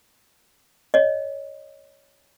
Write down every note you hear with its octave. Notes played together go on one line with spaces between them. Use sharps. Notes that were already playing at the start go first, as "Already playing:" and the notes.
C#5 D#5